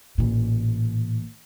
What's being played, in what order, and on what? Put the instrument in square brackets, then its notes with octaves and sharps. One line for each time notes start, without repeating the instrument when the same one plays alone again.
[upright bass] A1 A#2